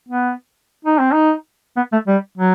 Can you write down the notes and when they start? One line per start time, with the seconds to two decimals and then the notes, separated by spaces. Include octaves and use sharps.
0.09 B3
0.85 D#4
0.99 C4
1.13 D#4
1.77 B3
1.92 A3
2.07 G3
2.38 F#3